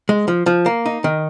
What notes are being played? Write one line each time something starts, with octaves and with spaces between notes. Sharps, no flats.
G#3
F3
F3
A#3
D#4
D#3